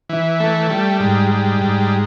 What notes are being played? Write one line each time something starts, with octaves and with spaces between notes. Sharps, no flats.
E3
A3
G3
G#2
G3
G#2